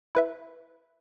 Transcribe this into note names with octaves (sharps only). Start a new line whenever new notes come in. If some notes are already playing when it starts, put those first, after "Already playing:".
E4 B4 E5